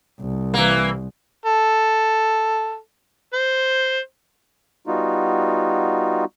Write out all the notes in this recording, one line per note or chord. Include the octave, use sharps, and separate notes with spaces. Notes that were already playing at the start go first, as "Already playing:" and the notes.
C2
E3 A#3
A4
C5
G3 B3 D#4 F4 F#4